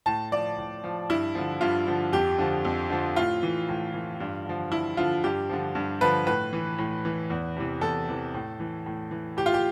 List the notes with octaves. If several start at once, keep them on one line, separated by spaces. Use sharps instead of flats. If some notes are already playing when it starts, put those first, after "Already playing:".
A2 A5
F3 D5
A2
F3
G2 E4
D3 F3
G2 F4
D3 F3
F2 G4
D3 F3
F2
D3 F3
A2 F4
E3
A2
E3
G2
D3 F3
G2 E4
D3 F3 F4
G2 G4
D3 F3
G2
D3 F3 B4
A2 B4
E3
A2
E3
E2
C3 E3
E2 A4
C3 E3
A2
E3
A2
E3
A2 G4
F4
G4